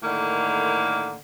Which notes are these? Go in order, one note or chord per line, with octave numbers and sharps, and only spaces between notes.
A2 D3 D#3 A#3